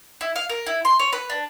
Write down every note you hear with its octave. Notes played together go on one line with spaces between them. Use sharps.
E4
F5
A#4
E4
C6
C#5
B4
D4